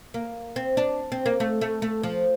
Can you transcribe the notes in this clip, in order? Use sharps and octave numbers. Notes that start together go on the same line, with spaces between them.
A#3
C4
D4
C4
A#3
A3
A3
A3
F3